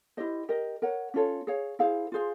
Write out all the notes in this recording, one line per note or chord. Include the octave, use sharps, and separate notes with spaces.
E4 G4 C5 D#5
G4 A#4 D#5
A#4 C#5 F#5
C#4 F4 A4 C#5
G#4 C#5 F5
E4 G#4 C5 F5
F4 G#4 C5 F5